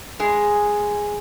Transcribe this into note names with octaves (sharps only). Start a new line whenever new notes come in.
G#3 G#4